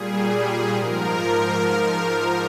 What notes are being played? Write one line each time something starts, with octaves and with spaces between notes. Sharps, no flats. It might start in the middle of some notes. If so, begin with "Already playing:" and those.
Already playing: A#2 G3 G#4
G#2 F3 A#4